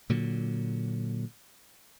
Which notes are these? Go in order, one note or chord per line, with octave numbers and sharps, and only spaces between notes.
A#2 D3 F#3